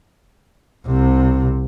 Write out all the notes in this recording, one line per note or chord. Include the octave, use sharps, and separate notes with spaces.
C2 C3